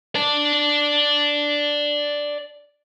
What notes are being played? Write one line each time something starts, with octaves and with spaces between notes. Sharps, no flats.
D5 A5